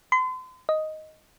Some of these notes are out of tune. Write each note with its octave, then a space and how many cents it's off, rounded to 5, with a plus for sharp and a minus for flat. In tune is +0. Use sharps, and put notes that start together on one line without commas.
C6 -40
D#5 +5